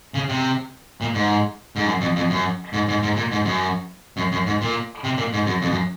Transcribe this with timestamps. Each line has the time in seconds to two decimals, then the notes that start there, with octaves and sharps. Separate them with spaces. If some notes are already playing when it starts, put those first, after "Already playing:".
0.14 C#3
0.29 C3
1.01 A#2
1.14 G#2
1.76 G#2
1.86 F#2
2.01 F2
2.16 F2
2.30 F#2
2.73 G#2
2.88 G#2
3.03 G#2
3.16 A#2
3.32 G#2
3.45 F#2
4.17 F#2
4.32 F#2
4.46 G#2
4.61 A#2
5.04 C3
5.17 A#2
5.33 G#2
5.46 F#2
5.62 F2
5.71 F#2